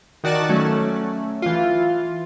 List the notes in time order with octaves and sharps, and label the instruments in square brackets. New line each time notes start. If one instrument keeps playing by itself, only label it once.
[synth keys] D#3 F#4 D5 A5 F#6
F#3 A3 C#4
E3 F4